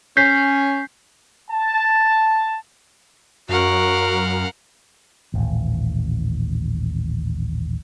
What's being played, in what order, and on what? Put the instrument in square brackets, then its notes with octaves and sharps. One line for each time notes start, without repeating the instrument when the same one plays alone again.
[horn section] C#4 [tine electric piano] G6 B6 C7
[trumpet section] A5
[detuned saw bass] F#2 [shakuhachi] F#4 [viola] A#4 [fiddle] F5 F#5
[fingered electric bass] D#1 A1